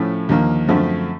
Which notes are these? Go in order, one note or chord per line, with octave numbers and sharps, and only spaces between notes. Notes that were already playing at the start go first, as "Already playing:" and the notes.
Already playing: A2 F3 A3 C#4
D#2 D3 F3 A#3
F#2 D3 F3 A3 C4